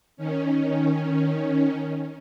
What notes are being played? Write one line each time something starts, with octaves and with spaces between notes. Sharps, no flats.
D#3 C#4